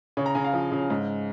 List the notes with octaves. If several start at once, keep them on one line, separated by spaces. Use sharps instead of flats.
C#3 C#5
A#5
C#3 G#5
F5
F3
C#3
G#2